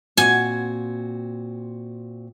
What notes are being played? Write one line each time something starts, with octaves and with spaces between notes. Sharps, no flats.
A#2 C4 F#4 G#5